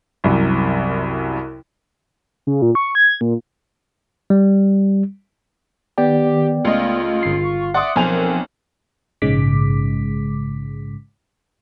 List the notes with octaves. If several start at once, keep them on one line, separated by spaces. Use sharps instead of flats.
C2 F#2 C3
C#3
A#2
C#6
G#6
A#2
G3
D#3 B3 G4 D5 G5
C#2 A3 F4 D#5
G1 F5 C7
C#6
D5 E5 F#5 C6 D#6
B1 F3 C4 A#4 G#5 F7
A#1 G#2 C#3 G#3 D6 B6